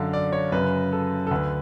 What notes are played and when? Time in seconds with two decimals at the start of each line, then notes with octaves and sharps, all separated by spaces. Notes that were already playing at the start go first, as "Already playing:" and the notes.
Already playing: F#2 D3 F5
0.13 D5
0.32 C#5
0.52 F#2 B4
0.57 C#3
0.92 A4
1.27 A4
1.31 D2 D3 B4